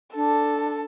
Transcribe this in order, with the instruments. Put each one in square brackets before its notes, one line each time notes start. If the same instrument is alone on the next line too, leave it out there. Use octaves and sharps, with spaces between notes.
[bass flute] D4 [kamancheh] A4